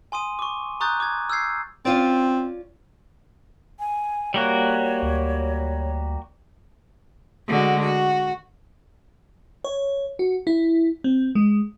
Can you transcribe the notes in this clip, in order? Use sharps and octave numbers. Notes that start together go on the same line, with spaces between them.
G#5 C6 D#6 D#7
C#6 D6
A#5 C#6 D#6 F#6 G6 A6
D6 G#6
E6 F6 G6 G#6 C7
C4 C#4 F4 D5
G#5
G3 A#3 F#4 C#5
D2
D3 G#3 F#4
F#4
C#5
F#4
E4
C4
G#3